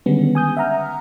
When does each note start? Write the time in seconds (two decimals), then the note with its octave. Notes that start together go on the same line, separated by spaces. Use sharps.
0.06 D3 D#3 G3 G#3 B3 C#4
0.35 G#5 D#6 G6
0.57 E5 F#5 A#5 F6